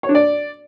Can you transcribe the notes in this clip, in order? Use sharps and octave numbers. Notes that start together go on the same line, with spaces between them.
C#5
D4
D5